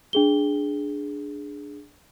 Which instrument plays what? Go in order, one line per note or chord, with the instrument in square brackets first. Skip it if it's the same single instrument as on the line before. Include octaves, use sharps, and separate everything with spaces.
[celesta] D4 G#4 G7